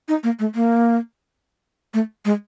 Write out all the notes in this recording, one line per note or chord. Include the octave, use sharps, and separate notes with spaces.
D#4
A#3
A3
A#3
A3
G#3